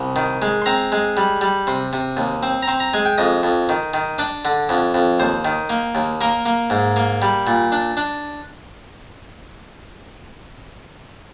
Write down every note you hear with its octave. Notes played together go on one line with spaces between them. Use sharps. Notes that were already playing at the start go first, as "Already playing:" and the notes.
Already playing: C2
D#3
G#3
C6
C4 A#5
G#3
G3
G3
C3 C6
C3
D#2
C4
A#5
C4 C6
A#5
G#3 G#5
G5
F2 D#5
F2
D#3
D#3
D4 D5
D3
F2
F2
D#2 C5
D#3
A#3
D#2
A#3 A#4
A#3
G#2
A#3
G3
A#2
D4
D4